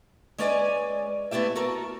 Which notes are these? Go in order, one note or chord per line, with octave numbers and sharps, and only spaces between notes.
G#3 C#4 B4 D5 E5 G#5
A3 B3 E4 G4 E5
F#4 A4 A#4